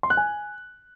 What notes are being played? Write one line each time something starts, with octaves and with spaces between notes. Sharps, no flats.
C6
F#6
G#5